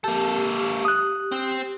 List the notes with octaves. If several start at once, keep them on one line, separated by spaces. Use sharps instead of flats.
A#3 G4 A4
D#6 F#6
C4